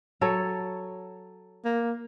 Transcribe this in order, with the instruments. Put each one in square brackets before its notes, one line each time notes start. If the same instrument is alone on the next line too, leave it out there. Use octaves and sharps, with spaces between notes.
[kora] F#3 A4 C#5
[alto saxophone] A#3